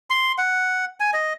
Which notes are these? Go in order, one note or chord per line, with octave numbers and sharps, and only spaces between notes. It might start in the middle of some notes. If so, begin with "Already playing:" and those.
C6
F#5
G#5
D#5